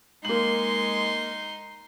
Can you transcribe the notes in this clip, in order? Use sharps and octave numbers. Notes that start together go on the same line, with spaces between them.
G#3 A#3 D#4 C6 F#7